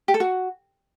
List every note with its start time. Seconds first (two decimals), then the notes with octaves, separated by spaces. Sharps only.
0.08 G4
0.14 A4
0.20 F#4